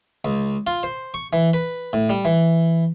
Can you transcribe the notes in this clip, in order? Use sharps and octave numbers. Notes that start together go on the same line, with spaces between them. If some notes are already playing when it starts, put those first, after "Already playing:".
C#2
F4
C5
C#6
E3
B4
A2
G3
E3